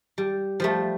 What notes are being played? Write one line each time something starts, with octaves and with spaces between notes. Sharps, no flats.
G3
F3 G3 A3